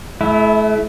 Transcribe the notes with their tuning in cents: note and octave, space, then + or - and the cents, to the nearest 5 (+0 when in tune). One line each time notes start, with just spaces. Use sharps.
A3 -40 E4 +0